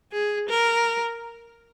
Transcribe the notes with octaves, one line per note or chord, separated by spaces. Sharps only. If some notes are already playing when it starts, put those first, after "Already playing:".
G#4
A#4